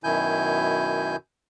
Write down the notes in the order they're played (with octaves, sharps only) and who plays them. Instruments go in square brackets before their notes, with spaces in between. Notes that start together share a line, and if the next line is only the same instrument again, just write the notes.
[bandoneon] F#2 B2 D#3 E4 G#5 G6